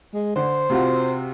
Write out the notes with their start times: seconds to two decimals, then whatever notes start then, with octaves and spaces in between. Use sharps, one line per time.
0.14 G#3
0.36 D3 C5
0.70 C3 F4 F#4